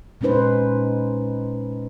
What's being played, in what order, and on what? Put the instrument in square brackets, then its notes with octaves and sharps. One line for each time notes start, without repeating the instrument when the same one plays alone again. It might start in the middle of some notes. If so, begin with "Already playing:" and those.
[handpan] A#2 G#3 C#4 D#4 B4 C5